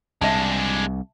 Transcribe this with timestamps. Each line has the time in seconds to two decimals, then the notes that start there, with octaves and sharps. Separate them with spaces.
0.21 C2 G#3 D4 E5 A5